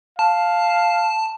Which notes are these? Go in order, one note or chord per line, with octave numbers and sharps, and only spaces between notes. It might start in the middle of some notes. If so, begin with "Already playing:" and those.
F5 A5